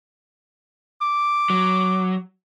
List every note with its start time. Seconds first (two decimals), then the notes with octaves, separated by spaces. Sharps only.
1.01 D6
1.50 F#3